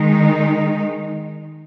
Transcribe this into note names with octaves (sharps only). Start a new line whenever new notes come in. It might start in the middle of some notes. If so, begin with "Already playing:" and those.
Already playing: D#3 G#3 D#4